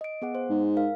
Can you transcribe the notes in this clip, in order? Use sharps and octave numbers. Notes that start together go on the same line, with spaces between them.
D#5 D7
B3 G#4 F#5
C5
G#2
A#4 F5